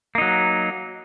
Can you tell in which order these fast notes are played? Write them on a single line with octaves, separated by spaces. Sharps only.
A#3 D#4 F#3